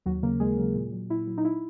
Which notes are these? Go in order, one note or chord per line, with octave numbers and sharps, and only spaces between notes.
D#2 F#3 F#4
C#3 F#3 A#3 A#4
D#2 G#3 G#4
C#3 F#3
A#2
F#3
A#2 E4
F#3
D#4
E4